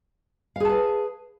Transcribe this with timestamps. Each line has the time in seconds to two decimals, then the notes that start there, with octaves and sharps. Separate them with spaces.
0.56 F5
0.60 G#4
0.65 A5
0.69 B4